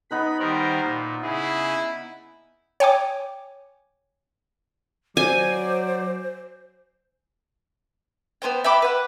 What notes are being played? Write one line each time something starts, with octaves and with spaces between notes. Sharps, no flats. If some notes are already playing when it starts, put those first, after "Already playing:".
B3 D#4 B4 B5
D#3 G3 A#4 C5
A#2
C#3 E4 G#4
C#5 G5 G#5 D6
F#3 C5 D5 G#5
B3 C#4 C5 G5
E5 G5 B5 D6
B4 F#5